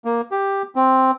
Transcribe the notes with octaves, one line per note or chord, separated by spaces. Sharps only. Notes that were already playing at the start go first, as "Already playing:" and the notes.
A#3
G4
C4